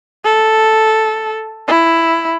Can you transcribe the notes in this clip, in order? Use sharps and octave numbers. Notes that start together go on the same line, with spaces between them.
A4
E4